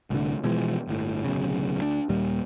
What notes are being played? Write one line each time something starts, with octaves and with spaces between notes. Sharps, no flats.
C2 A2 D3
B2 E3 F3 G#3
G1 A2
D1 B1 C#3
D2 D4
D#2 A#2 G3